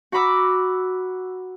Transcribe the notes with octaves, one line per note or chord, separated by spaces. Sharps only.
F#4 F#5 A#5 B5 D6 E6